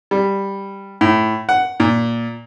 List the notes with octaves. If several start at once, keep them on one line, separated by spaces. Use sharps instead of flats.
G3
A2
F#5
A#2